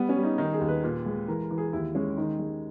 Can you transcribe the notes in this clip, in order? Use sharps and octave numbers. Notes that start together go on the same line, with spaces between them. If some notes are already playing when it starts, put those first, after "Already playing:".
Already playing: G3 B3
C#4
G3
D#4
D#3 D#4
G#4
D#2
B4
A#2
G#3
E3 A#4
E3
G#4
D#2 E4
G#3 C#4
D#3 D#4
G#3